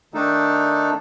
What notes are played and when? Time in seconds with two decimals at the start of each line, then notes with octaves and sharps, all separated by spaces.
0.14 D#3 A3 D4 D#4 A4